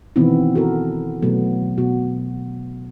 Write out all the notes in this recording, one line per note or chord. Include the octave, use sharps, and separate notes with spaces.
B2 D#3 E3 B3 C4 E4
F#4 A4 A#4
B2 F#3 A3 B3
B2 F#4